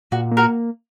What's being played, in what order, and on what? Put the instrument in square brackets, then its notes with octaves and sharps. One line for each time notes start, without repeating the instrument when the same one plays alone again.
[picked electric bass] A#2 [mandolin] F#4
[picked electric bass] A#3
[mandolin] F#4 A#4